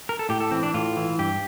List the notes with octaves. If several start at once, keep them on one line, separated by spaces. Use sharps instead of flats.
A#4
A4
A2 G4
A4
E3 C4
D4
A2 F4
E3
G2 G4